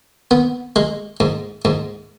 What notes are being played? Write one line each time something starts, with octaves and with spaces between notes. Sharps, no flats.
B3
G#3
G#2
G#2